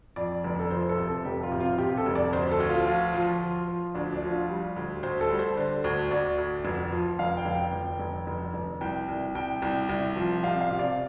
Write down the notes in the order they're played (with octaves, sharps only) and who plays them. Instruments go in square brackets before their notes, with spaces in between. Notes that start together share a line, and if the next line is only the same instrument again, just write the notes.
[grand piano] F2 D5
F1
A4
F3 C5
A4
C3
A4
F1 G4
F4
C3
F4
C3 G4
A4
F1
D5
D2 C5
A4
D2
F4
F3 F4
F3
F3
F3
D2 D4
D4
F3
F4
G3
D2
D2 C5
A4
G3
C5
D3
D2
D2 D5
D2
F1
F3
F1 F5
G5
F1
G5
F1
F1
F1
F1
C2 G5
C2
C2 G5
C2
C2
F3
C3 F5
F5
C3
D5